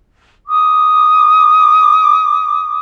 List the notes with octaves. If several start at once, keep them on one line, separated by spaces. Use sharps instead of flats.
D6 D#6